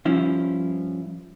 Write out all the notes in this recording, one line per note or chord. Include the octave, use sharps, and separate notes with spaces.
G2 F3 C#4 E4